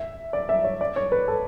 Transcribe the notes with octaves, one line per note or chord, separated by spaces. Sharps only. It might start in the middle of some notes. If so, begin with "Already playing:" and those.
Already playing: E5
D5
E5
C#5
D5
C#5
B4
A4